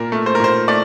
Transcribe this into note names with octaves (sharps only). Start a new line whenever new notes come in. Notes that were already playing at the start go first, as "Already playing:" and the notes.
Already playing: A#2 A#4
A3
C5
A#4
A#2 C5
A3 D5